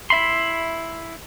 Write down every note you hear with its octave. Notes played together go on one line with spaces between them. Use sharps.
E4 E5 B5 C6